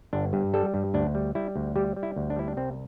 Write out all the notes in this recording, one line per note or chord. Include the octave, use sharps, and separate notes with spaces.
G1 D4
G2
G3 A4
G2
D2 D4
G3
G3 E4
D2
G3 G4
G3
E4
D2
D4
G3 E4
D4
C2 C4